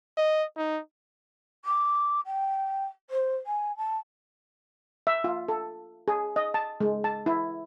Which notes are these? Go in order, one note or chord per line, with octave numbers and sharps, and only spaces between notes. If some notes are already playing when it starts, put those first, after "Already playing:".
D#5
D#4
D6
G5
C5
G#5
A5
E5
F4
A4
G#4
D#5
A5
G#3
A5
E4